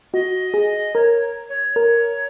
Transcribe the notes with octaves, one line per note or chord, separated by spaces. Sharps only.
F#4 D#5
G#4
A#4 C#5
C#5
A#4